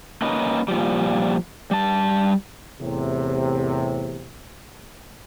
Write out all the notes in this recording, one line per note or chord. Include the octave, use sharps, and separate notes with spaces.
A#3 C#4 D#4 B4 D#5
A#2 F3 G3
G3 A5
E2 A2 C3